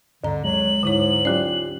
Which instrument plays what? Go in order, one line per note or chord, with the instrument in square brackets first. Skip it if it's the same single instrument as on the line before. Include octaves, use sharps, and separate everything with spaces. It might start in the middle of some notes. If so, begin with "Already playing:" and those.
[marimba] D2 A#5 [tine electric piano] G2 [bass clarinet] D3
[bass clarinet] F#3 [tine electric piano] G#3 [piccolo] F#7
[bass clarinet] G#2 [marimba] D3 E4 C#5
[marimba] F#3 D5 [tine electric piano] C#4 F4 G4